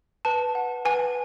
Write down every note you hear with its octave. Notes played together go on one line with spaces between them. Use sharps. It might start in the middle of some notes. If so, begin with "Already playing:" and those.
B4 A5
F#5
B4 G#5